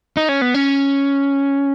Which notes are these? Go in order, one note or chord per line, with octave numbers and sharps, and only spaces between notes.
D#4
C#4
B3
C#4